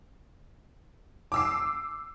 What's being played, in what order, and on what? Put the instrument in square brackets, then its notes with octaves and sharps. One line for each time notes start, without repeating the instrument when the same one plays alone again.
[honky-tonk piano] D6 E6 C7